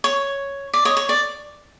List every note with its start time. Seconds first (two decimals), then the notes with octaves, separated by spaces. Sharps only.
0.04 C#5
0.74 D5
0.85 C#5 D#5
0.97 C#5
1.09 D5